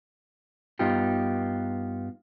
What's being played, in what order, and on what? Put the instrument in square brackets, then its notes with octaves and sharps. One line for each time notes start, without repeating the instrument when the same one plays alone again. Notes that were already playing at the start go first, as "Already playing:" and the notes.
[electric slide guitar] G2 B3 D#4 F4 G4